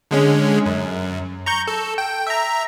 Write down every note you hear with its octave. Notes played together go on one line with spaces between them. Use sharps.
D3 G#3 C#4
F#2
A#5 C#6 G6
A4
G5
E5 A#5